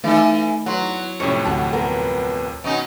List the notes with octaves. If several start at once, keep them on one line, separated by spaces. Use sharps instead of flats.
E3 A3 D#4 A4
E2 F#3 F#5 C6 C#6
F2 A2 C3 C4 C#4 C#5 C#6 C#7
D2 F#4 F#5 A5
B3 A#4
B2 C#4 D#4